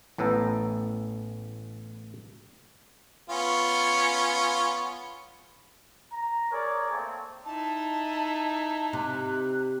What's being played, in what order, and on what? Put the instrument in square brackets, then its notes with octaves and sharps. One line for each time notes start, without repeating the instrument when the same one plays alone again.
[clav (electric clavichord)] A1 A2 B3 A4 A#5
[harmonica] B3 C#4 F4
[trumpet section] A#5
G#4 A#4 C#5 D5
A3 A#3 C4
[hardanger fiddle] D#4 E4 [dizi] A5
[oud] C3 [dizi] F#6